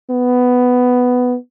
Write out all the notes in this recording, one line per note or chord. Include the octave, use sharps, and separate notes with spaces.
B3